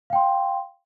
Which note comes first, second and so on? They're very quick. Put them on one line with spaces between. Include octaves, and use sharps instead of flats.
F5 G5 C6